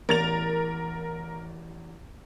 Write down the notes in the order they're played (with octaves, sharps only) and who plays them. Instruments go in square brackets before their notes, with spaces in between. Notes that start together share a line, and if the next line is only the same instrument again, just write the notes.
[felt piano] A1 E2 [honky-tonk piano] A#4 A6 F7